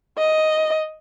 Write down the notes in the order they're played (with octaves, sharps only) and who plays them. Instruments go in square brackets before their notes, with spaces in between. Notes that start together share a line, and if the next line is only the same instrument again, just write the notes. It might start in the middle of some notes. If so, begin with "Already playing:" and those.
[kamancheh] D#5